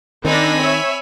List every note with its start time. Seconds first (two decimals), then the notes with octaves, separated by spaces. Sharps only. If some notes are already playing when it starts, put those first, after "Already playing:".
0.25 D#3 C4 D4 D#4 G#5 B5 A#6
0.61 C#5 E5